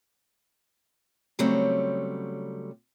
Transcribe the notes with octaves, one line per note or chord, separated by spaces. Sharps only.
C#3 F#3 G3 A3 C4 C#5